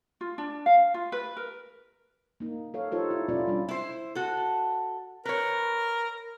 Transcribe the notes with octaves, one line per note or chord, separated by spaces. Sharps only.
F4
D4
F5
F4
B4
A#4
A#3 D#4
A4 C#5 F5
D#4 F4 G4 A4 C5 C#5
E4
B2 C#4 E4 F4 A4 D5
G3 D4 F4
E4 C5
F#4 A4
A#4 B4 C#5